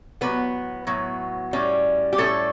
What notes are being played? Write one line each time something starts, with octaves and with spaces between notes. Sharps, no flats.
A2 F#3 B3 B4
A2 F#3 B3
A2 G3 C#4
G4
A2 G3 C#4 A4